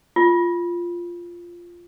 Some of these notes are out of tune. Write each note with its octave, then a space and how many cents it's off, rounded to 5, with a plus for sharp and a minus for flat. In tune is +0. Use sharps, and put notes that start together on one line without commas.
F4 -5